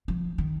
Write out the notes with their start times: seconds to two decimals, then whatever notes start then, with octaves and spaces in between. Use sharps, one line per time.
0.08 F3
0.38 D#3